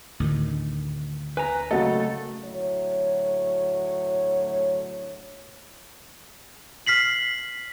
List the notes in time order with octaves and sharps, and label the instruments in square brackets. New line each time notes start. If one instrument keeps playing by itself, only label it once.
[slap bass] D2 A2 D#3
[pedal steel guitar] B4 A#5 [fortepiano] G#5
[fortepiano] C#3 F#3 A#3 [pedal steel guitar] A3 A4 [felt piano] D#5 F#5 A6
[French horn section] D2 A2 F#3 C#5
[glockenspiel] F6 B6 C7 F#7